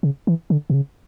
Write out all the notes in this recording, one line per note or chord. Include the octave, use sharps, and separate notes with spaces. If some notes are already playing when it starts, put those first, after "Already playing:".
C#3
E3
D3
B2
C#3